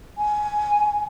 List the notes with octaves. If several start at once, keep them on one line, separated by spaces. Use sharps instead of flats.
G#5